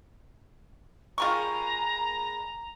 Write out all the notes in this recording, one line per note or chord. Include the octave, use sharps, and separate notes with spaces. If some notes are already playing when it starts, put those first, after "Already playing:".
A#2 G3 G#3 F4 G4 A#5 C#6